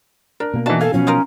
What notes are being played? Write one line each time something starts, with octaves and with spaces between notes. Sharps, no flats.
D4 A#4
B2 A#3
E3 D4 D#4 F#4 A5
A4 F5 G#5
B2 F3 F#3 C#4
D#4 F4 A#4